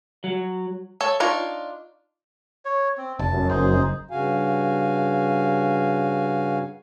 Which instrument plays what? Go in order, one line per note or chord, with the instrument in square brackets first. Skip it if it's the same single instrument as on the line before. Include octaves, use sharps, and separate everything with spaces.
[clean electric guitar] F#3
[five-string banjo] A4 C#5
D4 D#4 F4 C#5
[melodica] C#5
C4
[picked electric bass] F1 [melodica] A5
[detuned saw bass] F#2
[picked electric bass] F#1 [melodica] D#4 G#4 C5
[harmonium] G2 C#3 F#4 F5 G#5